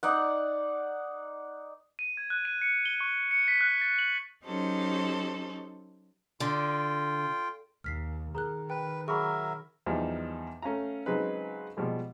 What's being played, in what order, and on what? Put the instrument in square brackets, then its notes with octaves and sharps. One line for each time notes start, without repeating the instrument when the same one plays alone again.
[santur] D#4 D5 F#5
[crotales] D#7
G#6
F#6
D#7
C#7
G7
C#6
C#7
B6
F#6
A6
F#7
[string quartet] F#3 C#4 D#4 G4 A4 C5
[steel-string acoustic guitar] D3 [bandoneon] F4 G5
[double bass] D#2 [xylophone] F6 B6 C7
[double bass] D#3 [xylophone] G#4 A#4 F#6 [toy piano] A#5
[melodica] B4 [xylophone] G5
[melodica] F#3 A#4 E5 [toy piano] G#4 B5 [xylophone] C#6
[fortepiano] E2 F3 G3 D#4
A3 C#4 F5 A#5
C#3 F#3 G#3 C4 D#4 B4
B2 F3 G3 G#3